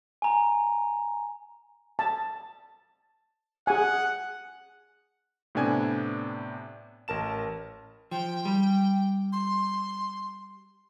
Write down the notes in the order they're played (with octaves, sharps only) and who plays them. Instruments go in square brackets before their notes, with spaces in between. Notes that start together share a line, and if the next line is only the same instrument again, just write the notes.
[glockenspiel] G#5 A#5
[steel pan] A5
[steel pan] G#4 G#5 [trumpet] F#5
[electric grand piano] A2 C3 B3 D4 G#5 G#6
A1 A#4 A5 E7
[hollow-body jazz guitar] F3 [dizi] G5
[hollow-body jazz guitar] G3
[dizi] C6